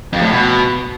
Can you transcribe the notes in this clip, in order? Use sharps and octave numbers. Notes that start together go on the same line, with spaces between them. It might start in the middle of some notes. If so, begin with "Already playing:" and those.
F2
A2
B2